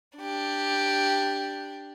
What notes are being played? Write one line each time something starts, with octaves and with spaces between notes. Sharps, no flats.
D4 G4